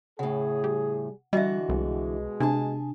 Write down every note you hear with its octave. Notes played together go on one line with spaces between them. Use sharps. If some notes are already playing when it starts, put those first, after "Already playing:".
A2 C#3 G#4 F#5
G3
D3 E3 G3 F#4 D#5 E5
C2 B2 G#3
C3 D4 G#4 G#5 A5